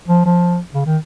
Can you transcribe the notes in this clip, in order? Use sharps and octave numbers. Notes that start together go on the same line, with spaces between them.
F3
F3
C#3
D#3